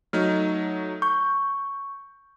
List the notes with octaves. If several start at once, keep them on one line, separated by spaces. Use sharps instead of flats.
F#3 A3 D#4 F6
C#6 G6